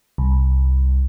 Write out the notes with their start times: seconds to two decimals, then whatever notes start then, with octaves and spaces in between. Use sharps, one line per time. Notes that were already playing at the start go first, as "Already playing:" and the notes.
0.18 C2